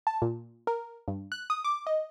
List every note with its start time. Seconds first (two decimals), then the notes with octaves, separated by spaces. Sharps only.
0.07 A5
0.22 A#2
0.67 A#4
1.08 G2
1.32 F#6
1.50 D#6
1.64 D6
1.87 D#5